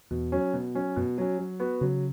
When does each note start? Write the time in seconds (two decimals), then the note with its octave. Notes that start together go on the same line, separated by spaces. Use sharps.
0.11 E2 B2
0.32 F#3 C#4
0.53 B2
0.75 F#3 C#4
0.96 F#2 B2
1.18 F#3 C#4
1.39 F#3
1.60 B3 F#4
1.81 C#3 F#3